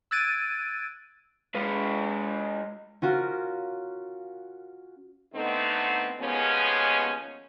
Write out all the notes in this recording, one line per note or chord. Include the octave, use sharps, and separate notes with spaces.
E6 F#6 G#6 A6 D7 D#7
G#3 B4
C#4 F4 F#4 A#4
D3 A3 B3 C4 D#4
D#2 F3 G#3 B3 C#4